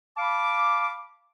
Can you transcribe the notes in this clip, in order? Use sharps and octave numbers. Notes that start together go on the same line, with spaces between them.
F5 A5 B5 D6